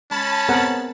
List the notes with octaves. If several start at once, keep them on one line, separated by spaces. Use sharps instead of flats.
G#3 C#4 A5 B5 A6
B3 C4 G#4 A#4 F#5